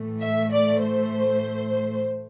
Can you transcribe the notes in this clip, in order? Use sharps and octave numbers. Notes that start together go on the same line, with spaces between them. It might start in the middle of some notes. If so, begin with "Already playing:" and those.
Already playing: A2 E3 A3
E5
D5
C5